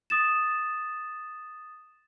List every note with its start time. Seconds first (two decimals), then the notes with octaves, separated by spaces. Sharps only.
0.10 D#6 A6 E7